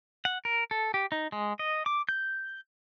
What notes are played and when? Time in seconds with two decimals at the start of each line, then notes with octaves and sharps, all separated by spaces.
0.25 F#5
0.45 A#4
0.71 A4
0.94 G4
1.12 D#4
1.32 G#3
1.59 D#5
1.86 D6
2.09 G6